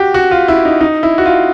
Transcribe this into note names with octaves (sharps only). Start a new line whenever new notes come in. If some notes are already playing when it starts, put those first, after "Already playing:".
Already playing: F#4 G4
F#4
F4
E4
D#4
D#4
E4
F#4
F4